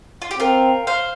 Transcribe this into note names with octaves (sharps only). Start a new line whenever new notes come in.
F4
G4
C4 F4 A#4
C5 F5